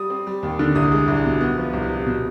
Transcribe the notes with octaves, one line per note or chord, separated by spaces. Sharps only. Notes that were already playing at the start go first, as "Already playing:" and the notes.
Already playing: G3 D#6
C4
G3
D#2
D3
C2 D#6
G#3
C2
B2
B3
F3
C2
C3
B2